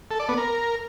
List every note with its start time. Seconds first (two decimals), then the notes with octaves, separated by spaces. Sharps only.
0.11 A4
0.20 D5
0.29 B3
0.38 A#4